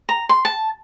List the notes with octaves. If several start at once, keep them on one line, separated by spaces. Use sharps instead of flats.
A#5
C6
A5